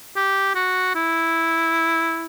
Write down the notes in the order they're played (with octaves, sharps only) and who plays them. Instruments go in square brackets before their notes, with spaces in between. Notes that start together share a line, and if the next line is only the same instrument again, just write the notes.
[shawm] G4
F#4
E4